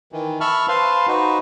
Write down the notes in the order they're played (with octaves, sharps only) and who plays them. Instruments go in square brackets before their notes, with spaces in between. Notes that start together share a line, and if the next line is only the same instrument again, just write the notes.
[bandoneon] D#3 E3
E5 A5 B5 C#6 F6
B4 C5 F5 A5 C6
D#4 F#4 B4 C5